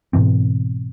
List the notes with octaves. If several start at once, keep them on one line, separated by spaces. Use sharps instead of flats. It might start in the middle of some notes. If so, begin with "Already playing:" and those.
G#2 B2 E3 C4